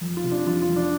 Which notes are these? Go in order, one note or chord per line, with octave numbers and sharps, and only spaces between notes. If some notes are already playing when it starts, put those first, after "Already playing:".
F2
F4
C3
D4
F2 F4
F4
F2
D4